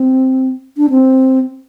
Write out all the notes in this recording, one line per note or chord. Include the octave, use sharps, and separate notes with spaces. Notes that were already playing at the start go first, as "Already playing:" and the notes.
Already playing: C4
D4
C4